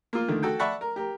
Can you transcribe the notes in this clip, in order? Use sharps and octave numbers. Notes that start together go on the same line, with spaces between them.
A#3 F4
D3 D#3 A3
F#4 A4 G5
D5 E5 F#5 A5 B5 C#6
A#4
G4 A#4